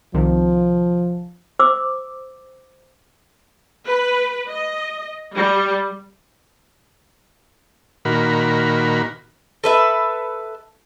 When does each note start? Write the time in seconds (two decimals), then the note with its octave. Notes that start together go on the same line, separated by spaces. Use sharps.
0.14 C2 C3 D#3 F3
1.59 C5 D6 E6
3.87 B4
4.50 D#5
5.35 G3
8.05 A#2 D#3 F#4 A#4 B5
9.64 A4 B4 E5